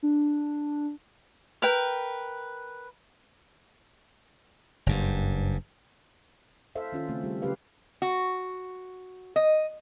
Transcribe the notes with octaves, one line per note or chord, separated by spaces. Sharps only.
D4
A#4 B4 G5
F#1 G2
A4 C5 E5 F5
D#3 C#4 F4
C#3 A3 C4
G3 F4 G#4
C#3 F#3 G4 B4 F5
F#4
D#5